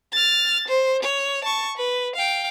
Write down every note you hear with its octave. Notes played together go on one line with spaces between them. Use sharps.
F6 A6
C5
C#5
A5 C#6
B4
F5 G5